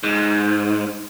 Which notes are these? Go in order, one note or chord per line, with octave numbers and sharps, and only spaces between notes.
G#2